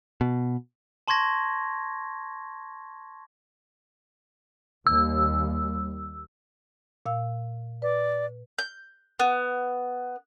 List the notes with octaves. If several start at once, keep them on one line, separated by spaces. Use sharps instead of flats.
B2
A5 C6 C#6 G#6 A#6
D#2 G3 E6
A#2 F5 E6
B4 D5
G6
B3